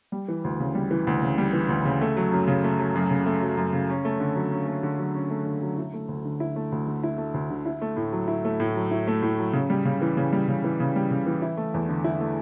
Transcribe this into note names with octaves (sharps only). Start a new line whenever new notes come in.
G3
E3
D2
C#3
G3
E3
D2
C#3
G3
E3
D2
C#3
A3
F#3
F#2
C#3
A3
F#3
F#2
C#3
A3
F#3
F#2
C#3
C#4
A3
D3
F#3
C#4
A3
D3
F#3
C#4
A3
D3
F#3
E4
A3
D2
D3
E4
A3
D2
D3
E4
A3
D2
D3
E4
A3
A2
F#3
E4
A3
A2
F#3
E4
A3
A2
F#3
C#3
G3
C#3
E3
C#3
G3
C#3
E3
C#3
G3
C#3
E3
E4
A3
E2
D3
E4
A3